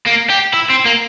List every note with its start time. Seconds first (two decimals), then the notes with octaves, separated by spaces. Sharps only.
0.06 A#3
0.30 G4
0.54 E4
0.70 C4
0.85 A#3